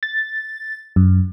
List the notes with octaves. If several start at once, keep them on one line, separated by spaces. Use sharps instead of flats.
A6
F#2